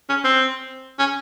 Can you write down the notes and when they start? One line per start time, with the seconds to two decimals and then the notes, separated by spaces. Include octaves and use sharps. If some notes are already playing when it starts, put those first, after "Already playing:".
0.10 C#4
0.24 C4
0.99 C#4